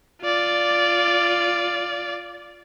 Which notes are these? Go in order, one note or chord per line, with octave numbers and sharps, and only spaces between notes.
F4 D5